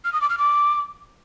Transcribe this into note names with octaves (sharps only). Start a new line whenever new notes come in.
F6
D#6
D6
F6
D6